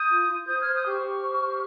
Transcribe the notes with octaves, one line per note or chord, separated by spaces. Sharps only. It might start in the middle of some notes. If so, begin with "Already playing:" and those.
Already playing: D#6 G6
F4
F4
C5 D#6 G6
C5 F6 G#6
D#6 G6
G4 C#6 F6
G4
C5
G4